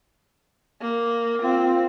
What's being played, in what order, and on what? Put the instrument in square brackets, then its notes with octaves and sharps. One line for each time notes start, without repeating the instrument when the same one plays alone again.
[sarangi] A#3
[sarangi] C4 [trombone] F4